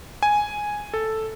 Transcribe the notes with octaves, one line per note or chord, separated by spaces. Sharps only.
G#5
A4